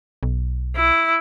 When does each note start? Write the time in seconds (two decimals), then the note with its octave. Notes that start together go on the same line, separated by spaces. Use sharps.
0.23 B1
0.76 E4